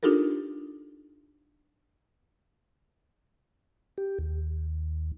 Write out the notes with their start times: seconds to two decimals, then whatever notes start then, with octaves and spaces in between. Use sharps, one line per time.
0.03 D4 D#4 F4 G4 A4 A#4
3.98 G4
4.18 D#2